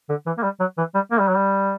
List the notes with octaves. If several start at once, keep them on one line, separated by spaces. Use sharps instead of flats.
D3
E3
A#3
G3
F#3
E3
G3
A#3
G3
F#3
G3